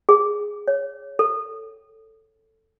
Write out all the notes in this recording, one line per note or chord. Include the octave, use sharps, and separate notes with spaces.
G#4
C#5
A4